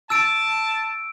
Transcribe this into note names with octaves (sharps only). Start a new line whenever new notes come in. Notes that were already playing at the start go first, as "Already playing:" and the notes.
A5 E6 D7